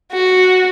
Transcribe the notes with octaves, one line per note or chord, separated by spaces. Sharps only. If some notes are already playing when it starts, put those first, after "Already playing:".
F#4